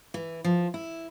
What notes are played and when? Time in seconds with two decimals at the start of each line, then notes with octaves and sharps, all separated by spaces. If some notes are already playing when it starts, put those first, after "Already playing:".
0.14 E3
0.44 F3
0.74 E4